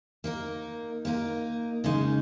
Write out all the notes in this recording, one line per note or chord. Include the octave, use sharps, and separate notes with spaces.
A#3 D#4 A#4
A#3 D#4 A#4
C#3 G#3 D#4